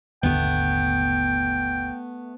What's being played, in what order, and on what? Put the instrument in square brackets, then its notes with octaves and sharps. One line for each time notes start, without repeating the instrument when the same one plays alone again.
[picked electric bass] G#1 D#2 D3 [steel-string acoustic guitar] A3 B3 [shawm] G5